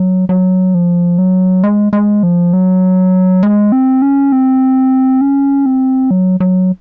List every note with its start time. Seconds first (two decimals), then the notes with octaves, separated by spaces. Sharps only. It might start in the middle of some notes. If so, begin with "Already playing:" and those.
Already playing: F#3
0.29 F#3
0.74 F3
1.18 F#3
1.63 G#3
1.93 G#3
2.23 F3
2.53 F#3
3.43 G#3
3.72 C4
4.02 C#4
4.32 C4
5.21 C#4
5.66 C4
6.11 F#3
6.40 F#3